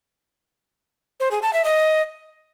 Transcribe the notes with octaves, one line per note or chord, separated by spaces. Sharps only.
C5
G#4
A5
E5
D#5